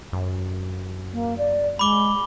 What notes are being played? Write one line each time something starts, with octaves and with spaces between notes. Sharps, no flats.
F#2
A#3
D5
G#3 B5 D6 G7